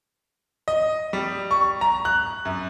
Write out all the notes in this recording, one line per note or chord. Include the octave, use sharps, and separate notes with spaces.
D#5
G3
C#6
A#5
F#6
F#2